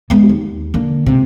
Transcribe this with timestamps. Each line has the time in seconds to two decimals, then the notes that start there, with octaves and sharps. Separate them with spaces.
0.10 G#3 B3
0.29 D#2
0.74 D3 A#3
1.06 C#2 C3